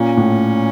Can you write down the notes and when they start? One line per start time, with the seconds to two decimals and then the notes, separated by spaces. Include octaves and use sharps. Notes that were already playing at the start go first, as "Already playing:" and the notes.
Already playing: A#2 C#4
0.17 A2